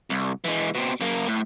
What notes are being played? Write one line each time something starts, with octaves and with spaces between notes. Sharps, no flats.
C2
E3 G#3
B2 C4
F#2 A#3
A2